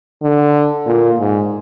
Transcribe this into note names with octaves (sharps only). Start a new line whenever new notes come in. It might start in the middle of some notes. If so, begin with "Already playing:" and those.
D3
A#2
G#2